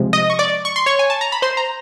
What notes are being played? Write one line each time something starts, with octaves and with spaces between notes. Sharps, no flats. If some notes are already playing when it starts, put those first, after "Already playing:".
Already playing: C3 F3 G#3
D#5 D#6
C#6
D5 D6
C#6
C6
C#5 C#6
G#5
A5
A#5
B5
C5 C6
A#5